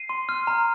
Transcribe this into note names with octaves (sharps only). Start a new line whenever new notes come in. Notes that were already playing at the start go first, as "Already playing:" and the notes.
Already playing: C7 D#7
C6
F6
A#5